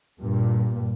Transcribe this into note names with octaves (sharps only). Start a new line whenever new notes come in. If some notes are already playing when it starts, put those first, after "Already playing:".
G2 A#2